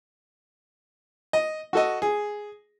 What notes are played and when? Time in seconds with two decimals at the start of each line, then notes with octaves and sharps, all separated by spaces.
1.33 D#5
1.73 F#4 A4 D#5
2.02 G#4